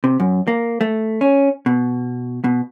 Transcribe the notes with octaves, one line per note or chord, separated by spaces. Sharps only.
C3
F#2
A#3
A3
C#4
B2
B2